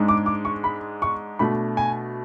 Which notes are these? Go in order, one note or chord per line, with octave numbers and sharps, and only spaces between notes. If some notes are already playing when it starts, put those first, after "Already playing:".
Already playing: G#2 G#3 D4
D6
D6
C#6
B5
C#6
B2 A3 D4 B5
G#5